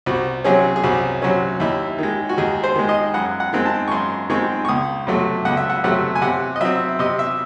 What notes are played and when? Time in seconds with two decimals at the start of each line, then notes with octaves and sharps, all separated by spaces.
0.06 C2 F#4
0.44 C3 F#3 C#4 G#4
0.76 G#4
0.83 C2 F#4
1.22 C3 F#3 C#4
1.60 D#2 E4
1.98 D#3 G#3
2.29 F#4
2.38 D#2 G#4
2.64 C5
2.75 D#3 G#3
2.89 D#5
3.14 F#2 F#5
3.40 F#5
3.53 D#3 G#3 C4
3.65 A5
3.88 C#6
3.91 F#2 C6
4.30 D#3 G#3 C4 C#6
4.65 C#6
4.68 C#2 D#6
5.07 C3 F#3 A3
5.45 C#2 F#5
5.57 E5
5.70 F#5
5.84 C3 F#3 A3 F#5
6.15 G#5
6.22 C3 F#5
6.56 D#5
6.61 F#3 C4 E5
6.99 C3 D#5
7.19 E5